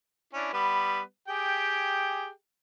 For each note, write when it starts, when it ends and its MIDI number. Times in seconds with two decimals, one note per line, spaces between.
0.33 0.50 61
0.33 0.50 62
0.33 0.50 64
0.53 1.00 55
0.53 1.00 59
0.53 1.00 71
1.28 2.29 67
1.28 2.29 68
1.28 2.29 79